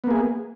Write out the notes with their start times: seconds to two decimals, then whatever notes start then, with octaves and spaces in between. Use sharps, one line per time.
0.04 B3
0.07 A#3
0.11 G#4